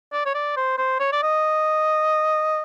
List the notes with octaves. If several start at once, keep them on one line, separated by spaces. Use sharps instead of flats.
D5
C#5
D5
C5
C5
C#5
D5
D#5